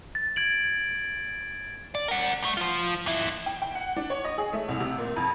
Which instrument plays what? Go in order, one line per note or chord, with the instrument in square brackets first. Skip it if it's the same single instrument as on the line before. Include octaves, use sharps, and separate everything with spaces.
[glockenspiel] A6
G#6 D7 F#7
[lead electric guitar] D5
A#4 F#5
C2 A3
F3 F4
F2 E4
[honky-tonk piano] G5
G5
F#5
D4
C#5
D#5
G#4
A3
C2
C3
A#2
F2